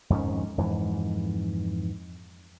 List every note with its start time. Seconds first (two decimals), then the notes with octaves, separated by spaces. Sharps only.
0.10 F2 G#2 D#3 C#4
0.58 F2 G#2 E3